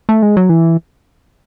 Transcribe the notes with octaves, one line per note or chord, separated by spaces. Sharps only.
A3
G#3
F#3
E3